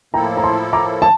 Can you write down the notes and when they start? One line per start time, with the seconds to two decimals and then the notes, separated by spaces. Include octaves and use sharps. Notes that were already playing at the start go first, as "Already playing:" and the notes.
0.14 A2 F3 A#3 E4 A4 G5 A#5
0.37 A#5
0.44 A5 C6
0.73 A#5 D6
1.02 A5